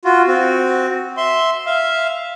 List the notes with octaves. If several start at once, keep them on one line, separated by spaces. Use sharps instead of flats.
F4 F#4
C4 F#4
E5 C6
E5 F5